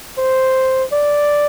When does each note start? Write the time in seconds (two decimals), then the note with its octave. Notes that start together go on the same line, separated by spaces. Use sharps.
0.18 C5
0.92 D5